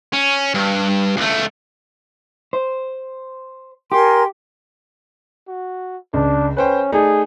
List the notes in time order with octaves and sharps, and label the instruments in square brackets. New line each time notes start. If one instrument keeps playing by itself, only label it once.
[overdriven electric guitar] C#4
G2
C#2 A3
[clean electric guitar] C5
[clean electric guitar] G4 [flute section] A#4 G#5 C6
[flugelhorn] F#4
[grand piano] C#2 [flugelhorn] D4
[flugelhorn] C#4 [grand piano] B4 C5 G5
[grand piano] A3 D#4 D5 [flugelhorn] G#4